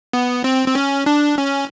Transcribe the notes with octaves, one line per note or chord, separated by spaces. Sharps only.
B3
C4
C4
C#4
D4
C#4